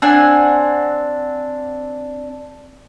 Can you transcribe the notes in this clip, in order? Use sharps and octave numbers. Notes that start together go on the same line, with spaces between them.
C4 D4 F#5 G#5